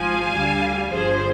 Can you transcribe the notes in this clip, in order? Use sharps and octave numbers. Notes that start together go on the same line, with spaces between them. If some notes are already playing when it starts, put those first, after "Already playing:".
Already playing: G#1 G#2 F3 F5 G#5
D2 D3 G3
G1 G2 D3 F3 G#4 C5